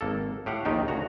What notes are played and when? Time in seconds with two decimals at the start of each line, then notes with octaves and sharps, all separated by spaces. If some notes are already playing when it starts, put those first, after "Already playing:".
0.01 G#1 A#3 A4
0.46 A2 G4 F5 F#5
0.65 A#1 D#2 D#3 D#4 G4
0.88 D2 C#3 F#4 A#5